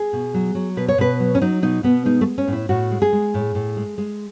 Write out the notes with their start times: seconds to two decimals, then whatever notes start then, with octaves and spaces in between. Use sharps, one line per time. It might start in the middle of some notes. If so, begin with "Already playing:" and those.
Already playing: G#4
0.13 B2
0.34 F#3
0.55 F#3
0.77 B2 B4
0.88 C#5
0.98 B2 B4
1.20 F#3
1.35 C#4
1.41 F#3 D#4
1.62 B2 D#4
1.83 B2 B3
2.05 G#3 D#4
2.21 A3
2.27 G#3
2.38 C#4
2.48 A2
2.53 E4
2.69 A2 F#4
2.91 G#3
3.02 G#4
3.13 G#3
3.34 A2
3.55 A2
3.77 G#3
3.98 G#3